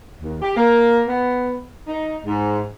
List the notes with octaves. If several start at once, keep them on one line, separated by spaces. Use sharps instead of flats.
D#2
G4
A#3
B3
D#4
G#2